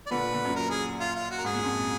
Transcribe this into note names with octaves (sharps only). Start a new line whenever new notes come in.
D5
A#2 D3 B4
A#2 D3
F#2 A#2
A#4
G#4
F4
F4
F#4
A#4
G#2 G#4
A#2
F2 G#2